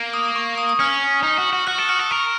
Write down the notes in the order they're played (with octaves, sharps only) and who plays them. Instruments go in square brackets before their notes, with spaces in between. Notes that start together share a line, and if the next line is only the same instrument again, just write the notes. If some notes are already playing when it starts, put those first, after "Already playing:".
Already playing: [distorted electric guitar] A#3
[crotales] D#6
C#6
D#6
D#6
[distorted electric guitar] C#4 [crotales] F6
[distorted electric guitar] D#4
F#4
F#4
[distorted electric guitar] F#4 [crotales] F#6
[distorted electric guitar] A4
[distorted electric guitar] F#4 [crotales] F6
[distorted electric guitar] A4
[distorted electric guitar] A#4 [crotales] C#6